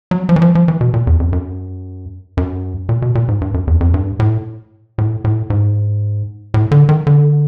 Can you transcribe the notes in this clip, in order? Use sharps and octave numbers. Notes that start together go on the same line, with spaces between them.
F#3
F3
E3
F3
F3
E3
B2
A#2
E2
F2
F#2
F#2
A#2
B2
A#2
G#2
G2
F#2
E2
F2
G2
A2
A2
A2
G#2
A2
D3
D#3
D3